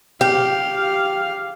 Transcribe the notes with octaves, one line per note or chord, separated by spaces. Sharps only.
G4 F5